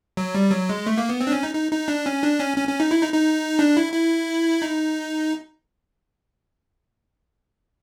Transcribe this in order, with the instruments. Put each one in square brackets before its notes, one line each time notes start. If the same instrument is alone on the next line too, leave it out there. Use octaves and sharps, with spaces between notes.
[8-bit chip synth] F#3
G3
F#3
G#3
A3
A#3
B3
C4
D4
C#4
D#4
D#4
D#4
D4
C#4
D4
C#4
C#4
C#4
D#4
E4
D#4
D#4
D4
E4
E4
D#4